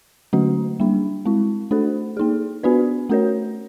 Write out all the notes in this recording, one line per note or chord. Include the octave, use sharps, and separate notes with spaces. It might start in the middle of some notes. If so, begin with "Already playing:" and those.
D3 F#3 A3 C#4 F#4
G3 A#3 D4
G#3 C4 E4
A3 D4 F#4 A4 C5
A#3 D#4 G#4
B3 D4 F#4 B4 D5
A3 C#4 F#4 A#4 C#5